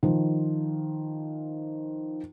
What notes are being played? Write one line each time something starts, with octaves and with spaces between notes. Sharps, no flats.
D#3 F3